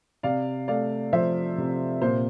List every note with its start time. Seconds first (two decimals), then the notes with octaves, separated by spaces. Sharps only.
0.23 C3 D5 F5
0.68 A3 D5 F5
1.13 F3 C5 E5
1.58 C3
2.02 A#2 C5